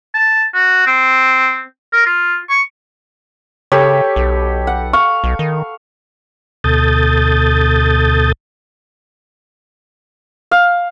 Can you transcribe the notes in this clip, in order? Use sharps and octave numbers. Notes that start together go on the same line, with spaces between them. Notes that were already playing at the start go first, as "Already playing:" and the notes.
A5
F#4
C4
A#4
F4
C#6
C#3 G4 A4 B4 C#5
B1
F#5
F5 C#6
B1
D#3
D2 B2 A4 D#6 G6 A6
F5